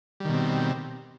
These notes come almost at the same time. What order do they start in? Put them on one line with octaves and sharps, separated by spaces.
G3 D#3 B2 C4